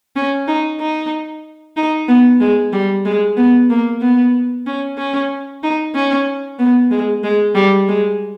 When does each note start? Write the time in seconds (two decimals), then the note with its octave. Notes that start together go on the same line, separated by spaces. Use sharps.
0.16 C#4
0.48 D#4
0.80 D#4
1.77 D#4
2.08 B3
2.40 G#3
2.73 G3
3.05 G#3
3.37 B3
3.70 A#3
4.01 B3
4.67 C#4
4.98 C#4
5.63 D#4
5.95 C#4
6.59 B3
6.91 G#3
7.24 G#3
7.55 G3
7.88 G#3